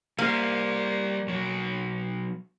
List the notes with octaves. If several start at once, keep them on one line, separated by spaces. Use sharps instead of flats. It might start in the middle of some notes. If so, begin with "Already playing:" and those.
G3 A#3 C5
B1 F#3